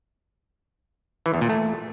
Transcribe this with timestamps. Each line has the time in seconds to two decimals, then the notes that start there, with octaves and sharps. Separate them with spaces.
1.26 E3
1.34 E2
1.41 A#2
1.49 A3